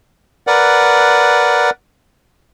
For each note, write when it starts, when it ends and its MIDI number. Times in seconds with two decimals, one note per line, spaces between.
0.47 1.70 70
0.47 1.70 71
0.47 1.70 74
0.47 1.70 78